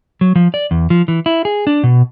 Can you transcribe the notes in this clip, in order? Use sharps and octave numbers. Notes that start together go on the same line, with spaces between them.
F#3
F3
D5
E2
F3
E3
E4
G#4
D4
B2